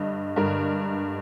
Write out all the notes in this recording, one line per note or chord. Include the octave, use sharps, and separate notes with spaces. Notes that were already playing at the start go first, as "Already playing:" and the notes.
Already playing: G2 D3 D#5
G2 D3 A#4